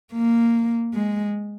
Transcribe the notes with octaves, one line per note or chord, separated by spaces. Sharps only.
A#3
G#3